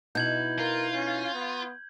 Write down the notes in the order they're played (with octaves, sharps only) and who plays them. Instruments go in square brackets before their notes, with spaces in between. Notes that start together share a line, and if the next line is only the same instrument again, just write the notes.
[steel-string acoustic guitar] B2 D#4 E4 [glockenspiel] G6 G#6 F#7
[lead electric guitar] F4 [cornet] A#4
[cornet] C#4
B3